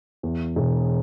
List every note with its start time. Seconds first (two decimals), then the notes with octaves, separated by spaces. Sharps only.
0.23 E2
0.56 E1